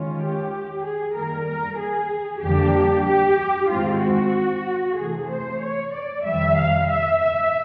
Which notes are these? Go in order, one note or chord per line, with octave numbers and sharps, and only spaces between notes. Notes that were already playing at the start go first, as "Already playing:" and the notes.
Already playing: D#3 G#3 C#4 F4
G4
G#4
D#3 G3 A#3 A#4
A#4
G#4
F2 D3 G3 A#3 D4 G4
G4
G#2 D#3 G#3 C4 F4
F#4
C3 E3 A3 G#4
C5
C#5
D5
F2 C3 D#3 G3 E5
F5
E5
E5